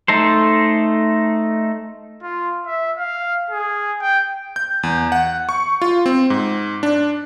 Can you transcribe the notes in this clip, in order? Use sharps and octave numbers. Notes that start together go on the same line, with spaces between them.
A3 D#4 A4 C5
F4
E5
F5
G#4
G5
G6
E2
F#5
C#6
F4
C4
G#2
D4